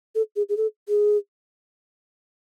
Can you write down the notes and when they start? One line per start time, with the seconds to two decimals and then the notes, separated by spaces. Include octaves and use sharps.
0.15 A4
0.36 G#4
0.49 G#4
0.57 A4
0.89 G#4